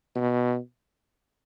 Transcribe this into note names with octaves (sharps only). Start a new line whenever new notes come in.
B2